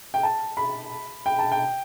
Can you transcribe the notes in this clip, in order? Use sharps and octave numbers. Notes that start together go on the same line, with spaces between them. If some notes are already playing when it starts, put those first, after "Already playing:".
G5
A5
B5
G5
A5
G5